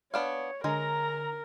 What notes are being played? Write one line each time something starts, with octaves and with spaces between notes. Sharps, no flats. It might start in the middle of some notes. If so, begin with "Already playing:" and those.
B3 D4 C#5 F5
D3 G#3 A#4 A#5